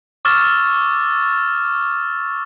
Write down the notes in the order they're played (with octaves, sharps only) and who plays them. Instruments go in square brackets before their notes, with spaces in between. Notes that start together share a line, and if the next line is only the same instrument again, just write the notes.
[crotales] C#6 D6 E6 F6 A6 E7